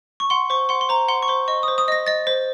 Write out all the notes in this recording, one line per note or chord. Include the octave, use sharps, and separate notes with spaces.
C#6
F#5 C6
C5 C#6
F#5 C6
C6
C5 A#5
F#5 C6
C#6
C5 C6
D#5 C#6
D#6
C5
D#6
D#5 A#6
D#5 A6
C5